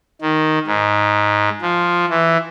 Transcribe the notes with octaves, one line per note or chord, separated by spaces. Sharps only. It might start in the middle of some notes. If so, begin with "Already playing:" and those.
D#3
G#2
F3
E3